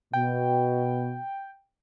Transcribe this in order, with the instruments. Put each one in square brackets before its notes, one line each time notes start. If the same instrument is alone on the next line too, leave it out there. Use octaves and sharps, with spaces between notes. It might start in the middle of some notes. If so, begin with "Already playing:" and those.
[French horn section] B2 [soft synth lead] G5